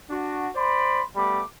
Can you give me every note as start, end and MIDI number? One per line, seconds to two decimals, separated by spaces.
0.10 0.50 62
0.10 0.50 66
0.55 1.03 72
0.55 1.03 74
0.55 1.03 83
0.55 1.03 84
1.16 1.43 55
1.16 1.43 57
1.16 1.43 59
1.16 1.43 83
1.16 1.43 86